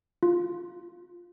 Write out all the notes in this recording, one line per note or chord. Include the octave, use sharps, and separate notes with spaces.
F4